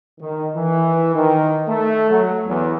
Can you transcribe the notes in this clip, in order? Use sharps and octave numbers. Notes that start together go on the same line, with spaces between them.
D#3
E3
D#3
A3
F#3
E2